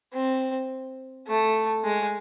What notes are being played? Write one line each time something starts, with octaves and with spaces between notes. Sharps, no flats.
C4
A3
G#3